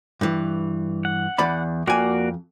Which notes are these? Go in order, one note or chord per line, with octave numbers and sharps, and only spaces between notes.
G2 E3
F#5
E2 D5 B5
F2 A#3 F#4 D5 G#5